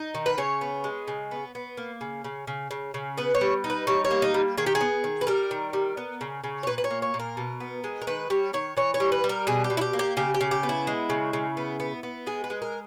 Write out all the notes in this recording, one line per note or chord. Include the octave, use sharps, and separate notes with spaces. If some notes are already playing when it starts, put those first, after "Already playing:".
Already playing: D#4
D#3
B4
C#3 C#5
B3
G#3
C#3
B3
B3
A#3
C#3
C#3
C#3
C#3
C#3
B3 B4
C#5
G3
D#4
B4
G3 C#5
C#5
A#3
D#4
G3
D#3 G#4
G4
G#4
B3
D#3
B4
G3 A#4
D#3
G3
B3
C#3
C#3
C#5
A#2 B4
B4
C#5
A#3
C#5
A#2
A#4
B2
B3
G#3
A#4
D#3 B4
G3 C#5
D#3 C#5
E3 C#5
C#5
G3
B4
G3
A#4
B2 G#4
G4
B2
E4
G4
A#3
G4
C#3 G4
G4
C#3
G4
B3
E4
G#3
C#3
C#3
B3
B3
B3
G#3 G#4
B4
G#3
A#4